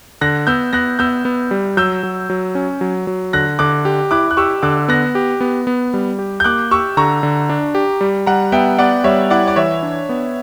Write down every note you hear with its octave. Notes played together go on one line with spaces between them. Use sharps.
D3 F#6 A#6
B3 E6 G6
B3 F#6 A#6
B3 E6 G6
B3
G3
F#3 E6 G6
F#3
F#3
C#4
F#3
F#3
D3 F#6 A#6
D3 D6 F#6
G4
E4 D6 F#6
F#6
G4 C#6 E6
D3 D6 F#6
B3 F#6 A#6
G4
B3
B3
G3
G4
G6
A#3 D6 F#6
G4 C#6 E6
D3 A#5 C#6
D3
D4
G4
G3
G3 F#5 A#5
B3 E5 G5
B3 D5 F#5
G3 C#5 E5
E4 D5 F#5
D5
E3 C#5 E5
D4
B3